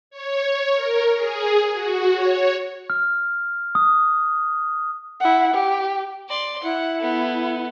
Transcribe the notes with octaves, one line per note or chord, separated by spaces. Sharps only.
C#5
A#4
G#4
F#4
C#5
F6
D#6
E4 F#5
G4
D5 C6
E4 F#5
B3 A4